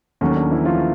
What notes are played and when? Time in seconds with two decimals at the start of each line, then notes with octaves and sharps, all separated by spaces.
0.21 D#2 D#3 F#3 A3 C#4
0.37 D4
0.51 E3 E4
0.65 F3 F4